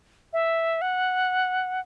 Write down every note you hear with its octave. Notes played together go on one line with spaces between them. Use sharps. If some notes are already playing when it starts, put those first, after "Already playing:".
E5
F#5